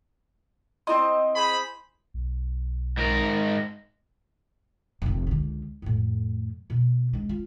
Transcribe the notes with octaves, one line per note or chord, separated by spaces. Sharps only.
C4 E4 D#5 C6
G#4 C5 B5
B1
G#2 A#4
F1 C3
C#2 D3
F2 A2
B2 B3
G#3 D4
F4